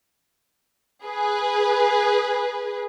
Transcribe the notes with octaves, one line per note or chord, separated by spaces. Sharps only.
G#4 B4